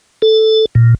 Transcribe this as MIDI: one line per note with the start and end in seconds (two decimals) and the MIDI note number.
0.22 0.66 69
0.75 0.95 46